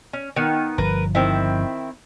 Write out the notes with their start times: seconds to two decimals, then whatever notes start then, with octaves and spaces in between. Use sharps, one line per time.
0.13 C#4
0.36 D#3 B3
0.78 G1 F3 A#4 B4
1.15 D#3 C4 E4